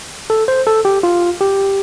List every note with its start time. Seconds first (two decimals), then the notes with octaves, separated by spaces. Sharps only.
0.30 A4
0.48 C5
0.67 A4
0.85 G4
1.03 F4
1.41 G4